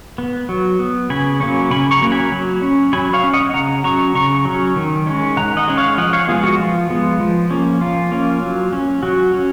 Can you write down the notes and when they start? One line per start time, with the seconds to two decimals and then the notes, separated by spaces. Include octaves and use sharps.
0.18 B3
0.49 F#3
0.79 B3
1.10 C#3 G#5 B5
1.40 F#3 A#3 C#4
1.71 C#3 G#5 B5
1.91 A#5 C#6
2.01 F#3 A#3 C#4
2.12 G#5 B5
2.32 F#3
2.62 C#4
2.93 F#3 G#5 B5
3.13 C#5 F5
3.23 C#4
3.33 D#5 F#5
3.54 C#3 F#5 A#5
3.84 F#3 C#4 A#5 C#6
4.15 C#3 A#5 C#6
4.45 F#3 C#4
4.76 D#3
5.06 G#3 C#4
5.37 D#3 F#5 A#5
5.57 D#5 F#5
5.68 G#3 C#4
5.77 C#5 F5
5.98 F3 D#5 F#5
6.13 C#5 F5
6.28 G#3 B3 F4 G#4
6.43 F#4
6.59 F3 F4
6.90 G#3 B3
7.20 F3
7.51 A#3 C#4
7.81 F3 F4
8.12 A#3 C#4
8.42 F#3
8.72 C#4
9.03 F#3 F#4
9.34 C#4